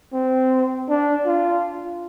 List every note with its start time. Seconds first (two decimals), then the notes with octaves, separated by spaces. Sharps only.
0.13 C4
0.89 D4
1.27 F4